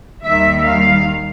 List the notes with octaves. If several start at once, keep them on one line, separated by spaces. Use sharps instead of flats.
D#2 D#3 G3 E5
F5